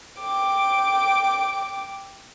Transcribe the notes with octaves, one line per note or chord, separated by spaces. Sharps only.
G5 D6